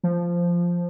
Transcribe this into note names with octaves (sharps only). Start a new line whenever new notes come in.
F3